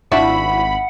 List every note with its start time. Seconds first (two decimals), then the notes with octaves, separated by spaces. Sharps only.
0.12 G#1 F3 D4 E4 F#4 F#5 B5